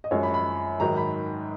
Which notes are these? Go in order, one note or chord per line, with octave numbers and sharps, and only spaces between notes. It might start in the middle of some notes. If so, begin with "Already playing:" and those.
D#5
F#2 F3 G#3 C#5
B5
B5
G#2 D#3 F#3 A#5
B5